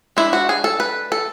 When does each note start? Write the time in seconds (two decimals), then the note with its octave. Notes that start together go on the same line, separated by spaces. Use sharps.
0.17 G#3 D4 E4
0.33 F#4
0.49 G#4
0.64 A4
0.80 B4
1.12 A4